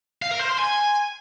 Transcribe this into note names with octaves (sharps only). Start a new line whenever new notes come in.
F5
A#4
C5
C6
G#5